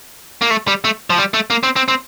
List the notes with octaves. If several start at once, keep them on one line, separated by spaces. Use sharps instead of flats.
A#3
A3
G3
A3
F3
G3
A3
A#3
C4
C4
C4